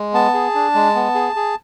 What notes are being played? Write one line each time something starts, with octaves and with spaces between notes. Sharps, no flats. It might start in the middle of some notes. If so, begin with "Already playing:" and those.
Already playing: G#3
B3 A5
G#4
D4
G#3
B3
G#4
G#4